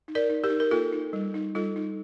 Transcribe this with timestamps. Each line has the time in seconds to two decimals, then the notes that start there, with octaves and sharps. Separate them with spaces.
0.08 D#4
0.15 A#4 D5
0.30 D#4
0.44 G4 A#4
0.50 D#4
0.60 A#4
0.71 A#3 F4 A4
0.93 D#4
1.13 G3
1.34 D#4
1.55 G3 F4 A4
1.76 D#4